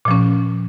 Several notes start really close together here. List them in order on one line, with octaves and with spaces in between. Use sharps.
A#2 F3 C#4